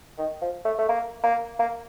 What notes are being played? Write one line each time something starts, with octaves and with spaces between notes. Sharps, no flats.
D#3
F3
A3
A3
A#3
A#3
A#3